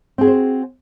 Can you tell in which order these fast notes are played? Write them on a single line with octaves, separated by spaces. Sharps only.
C4 G#4 F#4 C5